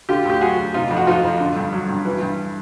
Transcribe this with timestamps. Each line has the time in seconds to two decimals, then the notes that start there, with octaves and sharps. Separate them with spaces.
0.09 D3 F4 G4
0.25 D2 G4
0.41 F#3 F#4 G#4
0.58 D2
0.74 C3 D#4 F4
0.91 F2
0.97 F#4
1.07 F3 D#4 F4
1.23 F2
1.40 D3
1.56 G2
1.73 F#3
1.89 G2
2.05 E3
2.22 G2